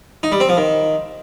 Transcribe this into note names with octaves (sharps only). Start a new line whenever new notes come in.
D#4
G3
C4
F3
D#3